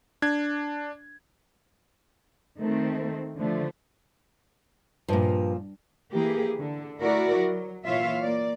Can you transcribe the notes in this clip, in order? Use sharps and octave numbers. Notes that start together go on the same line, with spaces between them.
D4 G#6
D#3 A3 C4
D3 F3 A3
G2 A#2 F3
E3 A#3 G4 G#4
D3
A3 E4 F#4 A#4 D5
F#3
A#2 E3 F4 C#5 E5 F5
A#3 D5